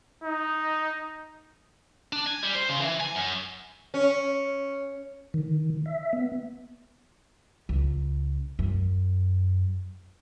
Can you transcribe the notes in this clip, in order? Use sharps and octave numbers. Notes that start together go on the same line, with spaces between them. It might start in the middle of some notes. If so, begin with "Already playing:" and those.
D#4
D4
G#5
G3
C5
C#3
E3
G#5
F#2
C#4
D#3
E5
B3
C#2
F#2